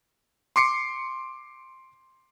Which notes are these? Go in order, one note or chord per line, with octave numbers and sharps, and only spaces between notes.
C6 D6 C7 C#7